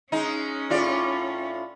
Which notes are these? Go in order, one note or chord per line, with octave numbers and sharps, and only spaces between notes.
G#3 C#4 D#4
A2 F4 D5